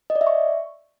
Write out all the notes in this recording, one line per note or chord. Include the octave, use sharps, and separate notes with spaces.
D#5
D5
E5
C#6